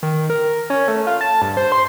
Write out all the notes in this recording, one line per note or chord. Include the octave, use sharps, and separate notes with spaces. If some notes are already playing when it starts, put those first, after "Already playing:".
D#3
A#4
C#4
A3
F4
A5
G2
C5
C6